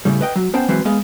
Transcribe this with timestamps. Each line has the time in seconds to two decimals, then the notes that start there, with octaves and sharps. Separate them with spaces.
0.05 A2 C#3 G3
0.21 B4 D#5 G5
0.36 F#3
0.53 B3 C#4 C5 F#5 G5 A5
0.69 E3 F#3 G#3 C4 B4 C5
0.85 G#3 B3 G#4 D#5 F5